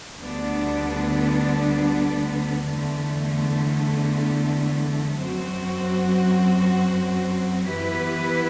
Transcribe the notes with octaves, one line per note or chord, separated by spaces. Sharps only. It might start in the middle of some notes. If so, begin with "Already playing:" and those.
D2 D3 G3 B3 D4
E2 D3 A3
F#2 F#3 C4 F#4
E3 B3 E4 G4 B4